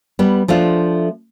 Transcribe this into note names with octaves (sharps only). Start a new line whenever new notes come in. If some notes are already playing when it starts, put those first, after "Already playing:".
G3 B3
F3 A3 D4 F4